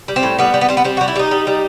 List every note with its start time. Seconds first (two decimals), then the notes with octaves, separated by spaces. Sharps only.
0.08 G3
0.16 C4
0.23 A2
0.38 G3 B3
0.54 G3
0.61 B3
0.69 G3 C4
0.77 B3
0.84 G3 C4
0.97 G3 F#4
1.08 E4
1.16 G3 D#4
1.31 G3
1.47 G3